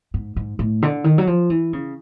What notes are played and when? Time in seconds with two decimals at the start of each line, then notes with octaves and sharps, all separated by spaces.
0.14 G#2
0.36 G#2
0.59 A2
0.82 D3
1.04 D#3
1.18 F#3
1.27 F3
1.50 E3
1.73 C#3